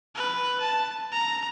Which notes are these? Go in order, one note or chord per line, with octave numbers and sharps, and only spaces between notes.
B4
A5
A#5